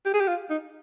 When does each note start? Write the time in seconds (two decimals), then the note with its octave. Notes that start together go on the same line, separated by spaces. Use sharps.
0.05 G4
0.14 G#4
0.20 G4
0.28 F4
0.50 D#4